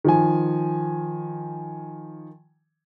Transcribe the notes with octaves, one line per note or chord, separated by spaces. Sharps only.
D#3 F3 G#5